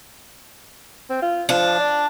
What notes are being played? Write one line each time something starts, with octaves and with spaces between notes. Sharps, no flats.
C4
F4
F3 D4
D5